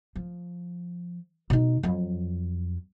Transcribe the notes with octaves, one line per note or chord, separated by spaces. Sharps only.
F3
B2 D#4
F2 F#3